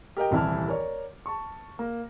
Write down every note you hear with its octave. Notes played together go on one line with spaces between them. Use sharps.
G4 A#4 D#5 G5
D#1 C2 E3 E4 A5 F6
A#4 C#5 D5
A5 C#6
A#3